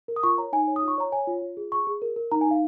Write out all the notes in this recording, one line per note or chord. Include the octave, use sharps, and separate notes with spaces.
A#4
D#6
F4 C#6
C#5 A#5
D#4 G#5
C#5
D#6
F4
C#6
C#5 A#5
C#5 G#5
F4
F4
G#4
G#4 C#6
G#4
A#4
A#4
D#4 A#5
G#5
D#4 F5